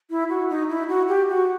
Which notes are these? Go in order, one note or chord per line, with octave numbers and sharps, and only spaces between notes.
E4
F#4
D#4
E4
F#4
G4
F#4